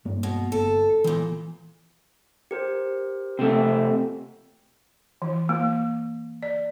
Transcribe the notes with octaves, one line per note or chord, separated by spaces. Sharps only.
G2 A#3
B2
G1 A4
E2 A#2 E3
G4 A#4 C5
C3 A3
E3
A#3
D5